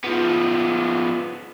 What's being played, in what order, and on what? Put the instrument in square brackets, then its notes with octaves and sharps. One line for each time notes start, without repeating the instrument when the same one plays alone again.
[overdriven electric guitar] F3 B3